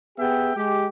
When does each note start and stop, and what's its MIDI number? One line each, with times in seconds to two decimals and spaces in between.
0.18 0.54 59
0.18 0.54 67
0.18 0.54 68
0.18 0.54 76
0.18 0.54 79
0.56 0.86 56
0.56 0.86 67